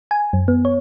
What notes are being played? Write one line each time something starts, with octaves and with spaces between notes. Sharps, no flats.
G#5
F#2
B3
C#5